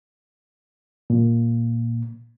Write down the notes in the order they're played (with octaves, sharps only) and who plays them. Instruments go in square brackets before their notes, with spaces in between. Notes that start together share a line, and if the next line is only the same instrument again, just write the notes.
[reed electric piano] A#2